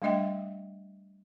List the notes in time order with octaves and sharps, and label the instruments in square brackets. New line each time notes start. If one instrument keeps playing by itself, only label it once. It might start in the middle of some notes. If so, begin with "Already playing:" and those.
[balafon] G3 A3 D4 D#5 E5 G5